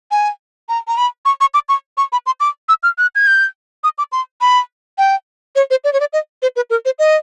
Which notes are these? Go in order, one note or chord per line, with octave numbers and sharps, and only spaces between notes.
G#5
A#5
A#5
B5
C#6
C#6
D6
C#6
C#6
B5
C6
D6
E6
F6
F#6
G#6
G6
D#6
D6
C6
B5
G5
C#5
C5
D5
C#5
D5
D#5
C5
B4
A#4
C5
D#5